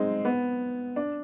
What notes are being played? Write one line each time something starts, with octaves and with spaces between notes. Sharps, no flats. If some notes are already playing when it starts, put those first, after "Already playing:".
Already playing: G#3 C4 D#4
B3
D4